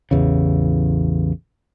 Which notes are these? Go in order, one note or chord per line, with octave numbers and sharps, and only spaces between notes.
A1 E2 C#3